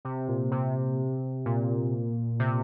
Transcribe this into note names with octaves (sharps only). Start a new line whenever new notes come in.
C3
A#2
C3
A#2
C3